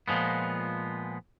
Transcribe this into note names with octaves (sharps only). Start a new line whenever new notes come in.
A#2 F3 G#3 B3